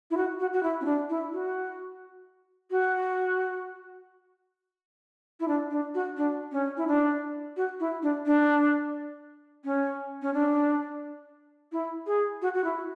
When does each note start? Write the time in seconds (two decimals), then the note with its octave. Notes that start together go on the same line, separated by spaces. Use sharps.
0.11 E4
0.17 F#4
0.40 F#4
0.53 F#4
0.63 E4
0.81 C#4
0.85 D4
1.10 E4
1.33 F#4
2.71 F#4
5.40 E4
5.48 D4
5.71 D4
5.95 F#4
6.17 D4
6.52 C#4
6.77 E4
6.87 D4
7.57 F#4
7.80 E4
8.03 D4
8.26 D4
9.65 C#4
10.22 C#4
10.34 D4
11.72 E4
12.07 G#4
12.42 F#4
12.55 F#4
12.64 E4